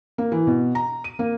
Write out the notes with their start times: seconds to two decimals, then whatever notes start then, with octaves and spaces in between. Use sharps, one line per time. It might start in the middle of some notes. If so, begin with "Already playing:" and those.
0.18 A#3
0.32 E3
0.47 B2
0.75 A#5
1.04 D#7
1.19 A#3